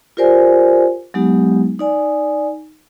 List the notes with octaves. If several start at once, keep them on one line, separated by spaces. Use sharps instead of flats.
F4 G4 A#4 C5 D5 G#5
F#3 G#3 B3 D#4 G4
D#4 D5 G#5